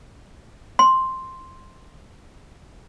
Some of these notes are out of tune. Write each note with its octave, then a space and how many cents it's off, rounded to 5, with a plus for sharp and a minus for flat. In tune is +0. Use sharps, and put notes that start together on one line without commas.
C6 +0